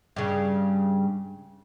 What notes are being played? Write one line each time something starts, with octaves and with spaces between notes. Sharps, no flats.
G2 C#3